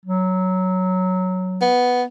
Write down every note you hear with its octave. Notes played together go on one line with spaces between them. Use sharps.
F#3
B3